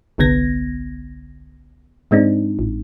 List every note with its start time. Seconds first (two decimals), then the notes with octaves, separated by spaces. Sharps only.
0.18 G1 C2 D3 B3 G#6 A#6
2.11 G#2 G#3 C4 D4 D#4
2.59 A1